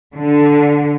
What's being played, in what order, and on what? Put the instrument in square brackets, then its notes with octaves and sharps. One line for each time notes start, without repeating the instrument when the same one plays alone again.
[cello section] D3